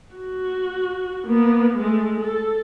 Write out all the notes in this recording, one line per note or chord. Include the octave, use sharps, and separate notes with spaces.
F#4
A#3 B3
G#3 A3
A4